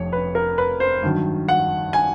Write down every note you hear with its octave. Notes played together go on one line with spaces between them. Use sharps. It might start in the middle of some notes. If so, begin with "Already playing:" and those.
Already playing: F1 F2 C#5
B4
A#4
B4
C5
G2 D#3 F#3
F#5
G#5